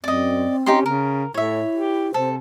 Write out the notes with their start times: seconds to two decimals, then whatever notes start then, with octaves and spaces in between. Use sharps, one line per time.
0.04 F#2 C4 D5 D#5
0.66 C#4 D#4 G4 C6
0.86 C#3 A#4
1.34 A2 E4 C#5 E5
1.73 G4
2.14 C3 A4 C5